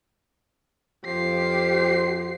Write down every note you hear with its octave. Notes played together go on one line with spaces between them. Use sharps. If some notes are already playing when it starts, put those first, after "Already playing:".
F2 F3 G4 C5 C7